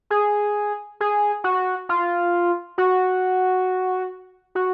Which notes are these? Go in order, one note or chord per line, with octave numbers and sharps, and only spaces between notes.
G#4
G#4
F#4
F4
F#4
F#4